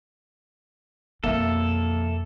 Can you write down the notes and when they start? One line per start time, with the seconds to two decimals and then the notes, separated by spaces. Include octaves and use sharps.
1.24 F2 B2 A#3 A4 E5